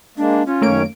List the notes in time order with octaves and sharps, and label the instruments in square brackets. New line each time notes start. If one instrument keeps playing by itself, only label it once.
[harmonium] G#3 A#3 [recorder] D4
[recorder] C#4 [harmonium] F4
[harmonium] F#2 D#3 C#5 [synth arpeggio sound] A3 A#3 D7